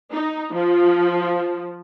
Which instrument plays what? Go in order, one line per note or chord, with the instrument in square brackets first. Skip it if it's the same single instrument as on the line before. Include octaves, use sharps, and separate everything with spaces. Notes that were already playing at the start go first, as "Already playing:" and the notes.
[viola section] D#4
F3